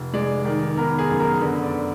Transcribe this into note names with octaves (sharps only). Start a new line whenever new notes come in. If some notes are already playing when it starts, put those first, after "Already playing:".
Already playing: F1
G#3 D5
D#3
B3 A#4
G#4
F#2
A#4
D3 B4
D5